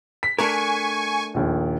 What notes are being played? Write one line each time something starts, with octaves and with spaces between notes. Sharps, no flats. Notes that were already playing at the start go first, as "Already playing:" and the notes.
B6
A3 D4 A#4 G#5 C#6
A#1 D#2